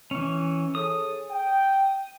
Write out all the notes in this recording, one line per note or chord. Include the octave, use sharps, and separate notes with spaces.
E3 C#4
G#4 A4 C#5 D#6
G5